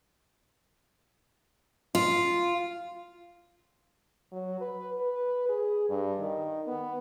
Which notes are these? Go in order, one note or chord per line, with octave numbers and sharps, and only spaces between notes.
F4
F#3
B4
B4
G#4
G2
D#3
B3